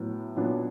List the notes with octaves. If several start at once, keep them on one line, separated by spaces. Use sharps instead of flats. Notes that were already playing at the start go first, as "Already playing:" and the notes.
Already playing: A2 F#3 B3
A#2 F#3 B3 D4